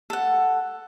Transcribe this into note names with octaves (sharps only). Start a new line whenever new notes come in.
A4 F#5